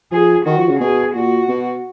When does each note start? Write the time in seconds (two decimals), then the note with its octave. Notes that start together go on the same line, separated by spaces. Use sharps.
0.12 F3 G#4
0.46 D#3 F#4
0.58 F3
0.69 C#3
0.80 B2 G#4
1.15 A#2 F#4
1.49 B2